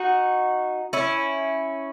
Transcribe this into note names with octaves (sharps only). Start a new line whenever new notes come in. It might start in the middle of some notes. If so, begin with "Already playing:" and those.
Already playing: D#4 F#4
C#4 E4